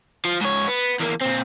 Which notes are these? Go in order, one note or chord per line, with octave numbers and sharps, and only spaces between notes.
F3
G#2 C#5
B3
E2 A#3
A#2 C4